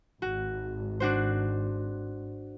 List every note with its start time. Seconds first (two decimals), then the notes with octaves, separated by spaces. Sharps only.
0.22 G#1 F#4
1.00 D4 F#4 C5